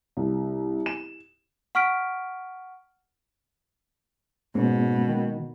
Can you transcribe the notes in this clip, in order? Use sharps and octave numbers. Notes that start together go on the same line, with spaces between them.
C2
E7
F#5 C#6 F6 B6 D7
G#2 B2 G#3 A#3 C#4
D#3